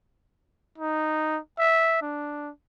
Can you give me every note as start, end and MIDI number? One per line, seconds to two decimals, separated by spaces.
0.78 1.39 63
1.59 1.97 76
2.02 2.50 62